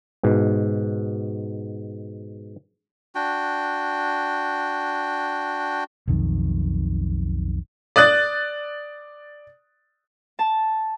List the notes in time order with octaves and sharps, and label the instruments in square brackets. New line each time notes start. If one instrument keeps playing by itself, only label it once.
[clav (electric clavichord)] G#2 B2
[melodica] D4 F#4 G5
[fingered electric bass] B1 F2 D#3
[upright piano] D5 D#6 F#6 A6
[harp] A5